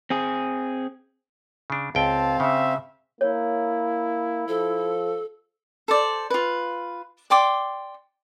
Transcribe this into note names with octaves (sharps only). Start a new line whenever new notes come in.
C4 G#4
C#3 D4
C#2 C4 F5 G5 A5
C#3 E5
A#3 E4 C#5
F3 A4
A4 C5 D5
F4 B4
D5 G5 C6 D6